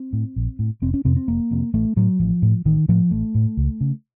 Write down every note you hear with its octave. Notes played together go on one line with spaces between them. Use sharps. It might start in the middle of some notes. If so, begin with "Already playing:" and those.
Already playing: C4
A2
A#1
A2
F1 C4
C#4
F2 C3 C4
C4
F1 A#3
F2 C3
A1 A3
A2 F#3
A1 F3
A2
A1 D#3
A2 F3
A1 A3
A2
C#2
C#3